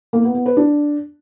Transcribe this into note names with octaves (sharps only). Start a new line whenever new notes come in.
A#3
B3
B3
B4
D4